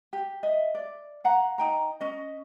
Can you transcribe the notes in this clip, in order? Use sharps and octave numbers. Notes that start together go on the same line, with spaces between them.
G4
D#5 E5
D5
F5 F#5 A#5
D#4 G5 A#5
C#4 D#5